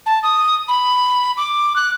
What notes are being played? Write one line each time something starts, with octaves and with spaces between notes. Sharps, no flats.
A5
D#6
B5
D6
F#6